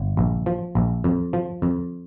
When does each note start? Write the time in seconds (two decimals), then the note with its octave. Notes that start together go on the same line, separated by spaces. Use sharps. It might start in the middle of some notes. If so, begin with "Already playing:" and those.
Already playing: G1
0.17 A#1
0.46 F3
0.75 A#1
1.04 F2
1.33 F3
1.62 F2